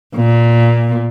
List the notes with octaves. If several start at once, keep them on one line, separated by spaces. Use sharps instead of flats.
A#2